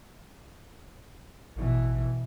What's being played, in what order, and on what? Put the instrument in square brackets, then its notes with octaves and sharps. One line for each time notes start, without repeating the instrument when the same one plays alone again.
[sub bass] A1 [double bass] B2 E3